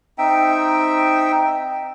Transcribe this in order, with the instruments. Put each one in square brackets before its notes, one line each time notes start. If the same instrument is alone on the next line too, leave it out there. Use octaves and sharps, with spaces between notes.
[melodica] C4 D#4 E5 G5